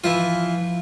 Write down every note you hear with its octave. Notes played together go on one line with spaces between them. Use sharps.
E3 F3 E4 F4